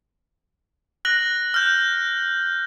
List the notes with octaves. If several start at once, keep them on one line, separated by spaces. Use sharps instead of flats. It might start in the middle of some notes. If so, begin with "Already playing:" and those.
F#6 A#6 F#7
F6 G6